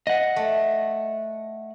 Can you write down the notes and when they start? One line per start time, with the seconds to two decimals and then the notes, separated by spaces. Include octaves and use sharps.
0.07 D#5 F#5
0.36 A3